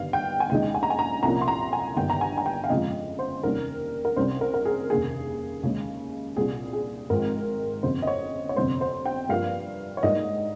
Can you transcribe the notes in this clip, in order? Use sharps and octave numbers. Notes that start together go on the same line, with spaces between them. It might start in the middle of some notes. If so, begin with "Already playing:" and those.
Already playing: G1 G2 D#3 F5
G5
G#5
D#2 C#3 G#3 D#4 G5
G#5
A#5
G#5
A#5
C2 A#2 F3 A#3 C#4 A#5
C6
A#5
G#5
G1 G2 D#3 G5
A#5
G#5
G#5
G5
F5
G1 F2 C#3 F3 G#3 D#5
C5
F1 D#2 D#3 G3 C#4 A#4
A#4
C2 C3 G3 C#4 C5
A#4
A#4
G#4
F1 D#2 C#3 G#4
D#2 C#3 G#3 C#4
C2 A#2 G3 C4 G#4
G#4
G#1 G#2 F3 G#3 C4 A#4
G1 F2 C#3 C5
D#5
C#5
C#5
G1 F2 C3 G3 C5
C5
G5
G2 F3 A#3 F5
C#5
G#2 G3 A#3 D#4 D#5